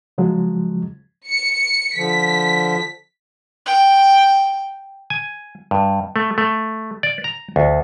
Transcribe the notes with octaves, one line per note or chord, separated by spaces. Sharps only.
C#3 F3 F#3 G#3
C#7
D3 F3 B6
G5
G#5
G2
A3
A3
D5
A#5
D2